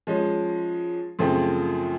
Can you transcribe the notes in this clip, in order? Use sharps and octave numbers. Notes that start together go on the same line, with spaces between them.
F3 G#3 C#4
F#2 C#3 F3 A3 C4